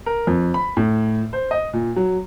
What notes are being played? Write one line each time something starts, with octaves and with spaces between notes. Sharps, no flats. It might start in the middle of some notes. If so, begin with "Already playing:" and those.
A#4
F2
B5
A2
C5
D#5
A#2
F#3